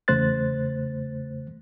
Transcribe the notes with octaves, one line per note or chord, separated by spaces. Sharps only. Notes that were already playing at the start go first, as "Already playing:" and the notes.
E2 C#3 A3 C5 F#6 A6